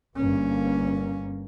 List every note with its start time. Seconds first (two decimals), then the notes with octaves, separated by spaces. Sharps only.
0.16 G1 A#3 C#4